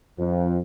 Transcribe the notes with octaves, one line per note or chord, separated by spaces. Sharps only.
F2